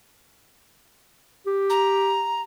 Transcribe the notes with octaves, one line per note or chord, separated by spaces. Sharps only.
G4
A#5